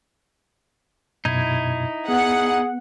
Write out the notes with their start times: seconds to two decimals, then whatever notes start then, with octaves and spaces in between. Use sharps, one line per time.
1.25 F#2 B2 D#4 E4 G#6
2.08 B3 G#4 F#5